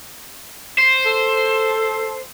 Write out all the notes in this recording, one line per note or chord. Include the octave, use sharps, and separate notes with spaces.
C5
A4